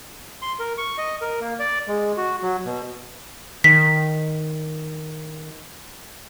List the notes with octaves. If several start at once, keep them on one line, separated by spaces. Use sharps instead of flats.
C6
A#4
C#6
D#5
A#4
A#3
D5
G#3
F#4
F#3
B2
D#3 B6